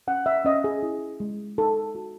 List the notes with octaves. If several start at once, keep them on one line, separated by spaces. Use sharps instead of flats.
C#4 F#5
E5
C#4 D#5
G#4
E4
G#3
D#4 A4
F#4